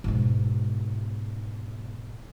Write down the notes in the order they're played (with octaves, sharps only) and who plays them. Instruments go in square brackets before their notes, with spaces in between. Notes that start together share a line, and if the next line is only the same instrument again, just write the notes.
[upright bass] G#2 B2